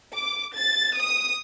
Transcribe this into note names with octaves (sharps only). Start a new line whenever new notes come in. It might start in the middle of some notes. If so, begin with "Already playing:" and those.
D6
A6
D#6